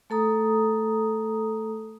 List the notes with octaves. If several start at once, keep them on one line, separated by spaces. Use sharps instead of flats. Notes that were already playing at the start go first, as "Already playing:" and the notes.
A3 A4 A#5 D#6